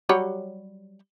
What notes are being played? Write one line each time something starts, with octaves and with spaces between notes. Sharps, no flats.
F#3 G3 C#5